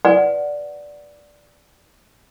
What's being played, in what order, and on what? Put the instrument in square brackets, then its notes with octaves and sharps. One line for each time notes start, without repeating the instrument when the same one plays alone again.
[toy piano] B4 D5 F#5 G#5